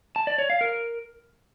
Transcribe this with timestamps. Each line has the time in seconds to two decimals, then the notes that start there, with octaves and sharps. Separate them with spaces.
0.16 A5
0.27 D5
0.38 C#5
0.50 F5
0.61 A#4